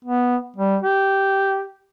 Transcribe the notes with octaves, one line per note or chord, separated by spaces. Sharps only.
B3
G3
G4